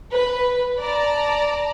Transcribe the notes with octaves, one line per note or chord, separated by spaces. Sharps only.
B4
D5 A5 A#5